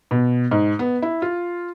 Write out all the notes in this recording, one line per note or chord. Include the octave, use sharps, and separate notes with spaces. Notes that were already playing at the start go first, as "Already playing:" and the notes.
B2
G#2
B3
E4
F4